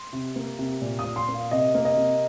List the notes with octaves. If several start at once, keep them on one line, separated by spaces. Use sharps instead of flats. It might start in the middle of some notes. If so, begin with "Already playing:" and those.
Already playing: C6
C3
A#3
C3
A#2
D#6
A#2
C6
A#3
F5
C3 D#5
A#3
D#5
C3